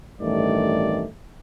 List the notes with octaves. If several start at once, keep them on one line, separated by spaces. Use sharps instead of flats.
A1 G2 D#3 A3 D5